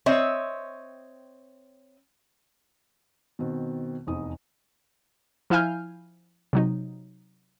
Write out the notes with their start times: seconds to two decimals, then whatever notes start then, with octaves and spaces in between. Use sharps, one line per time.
0.06 C4 C#5 D#5 E5
3.39 B2 D#3 C4
4.07 F1 E2 D#4 D#6
5.50 F3 E4 F5 G#5 F6 G6
6.53 C3 F#3 D#4